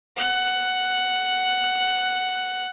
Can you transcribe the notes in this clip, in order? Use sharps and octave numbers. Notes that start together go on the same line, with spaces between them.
F#5 F#6